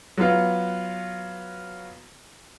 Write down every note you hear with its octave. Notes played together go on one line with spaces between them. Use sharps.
F#3 B3 F4